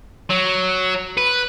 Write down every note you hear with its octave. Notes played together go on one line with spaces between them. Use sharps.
F#3
B4